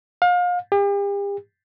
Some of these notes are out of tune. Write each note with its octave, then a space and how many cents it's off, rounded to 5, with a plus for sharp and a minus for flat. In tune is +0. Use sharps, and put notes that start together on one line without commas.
F5 +35
G4 +40